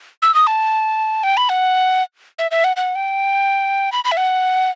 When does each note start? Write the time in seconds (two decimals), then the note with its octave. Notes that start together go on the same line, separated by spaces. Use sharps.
0.22 E6
0.34 D#6
0.47 A5
1.23 G5
1.37 B5
1.49 F#5
2.39 E5
2.51 E5
2.64 F#5
2.77 F#5
2.96 G5
3.92 B5
4.05 B5
4.12 E5
4.17 F#5